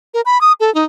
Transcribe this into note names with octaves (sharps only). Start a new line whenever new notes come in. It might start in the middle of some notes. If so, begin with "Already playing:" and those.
A#4
B5
D#6
A4
D#4